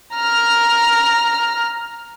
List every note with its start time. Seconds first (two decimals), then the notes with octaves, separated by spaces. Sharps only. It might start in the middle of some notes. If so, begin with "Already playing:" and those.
0.16 A#5 F6